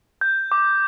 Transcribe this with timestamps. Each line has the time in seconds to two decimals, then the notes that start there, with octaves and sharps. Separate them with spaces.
0.21 G6
0.52 D6